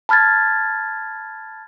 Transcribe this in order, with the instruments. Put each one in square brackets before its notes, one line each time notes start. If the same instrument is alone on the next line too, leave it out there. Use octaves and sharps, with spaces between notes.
[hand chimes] A5 B5 F6 G#6 A6